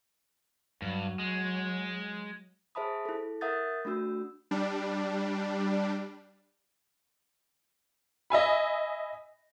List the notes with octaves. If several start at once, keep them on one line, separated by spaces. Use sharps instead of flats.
G2 F#3
G#3
G#4 C5 E5 A5 B5 D#6
E4 A4
A#4 E5 F#5 D#6 G6 A6
A3 D4 F#4 E6
G3 D4
D#5 E5 G#5 B5